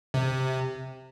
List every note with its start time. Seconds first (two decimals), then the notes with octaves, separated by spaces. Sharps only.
0.14 C3